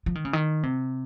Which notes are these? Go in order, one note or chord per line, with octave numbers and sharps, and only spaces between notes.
F3
D#3
C#3
D#3
C3